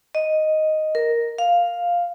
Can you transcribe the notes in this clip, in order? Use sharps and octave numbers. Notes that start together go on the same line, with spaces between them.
D#5
A#4
F5